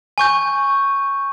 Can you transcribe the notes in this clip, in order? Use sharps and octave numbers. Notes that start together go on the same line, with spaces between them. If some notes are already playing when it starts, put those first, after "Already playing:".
G#5 C#6 G6